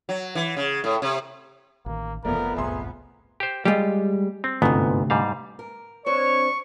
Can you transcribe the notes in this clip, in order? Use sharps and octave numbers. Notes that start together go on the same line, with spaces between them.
F#3
E3
C#3
A2
C3
A1 D#3 A#3
F#1 F2 A3 B3 A#4 D5
F#1 C2 A2 G#4 E5 A#5 C6
G4 C5
G3 G#3 F4 G4
C4
G1 D2 G#2 C3 B3
G#2 G3 F5
A#4
C4 D4 C5 C#5 C#6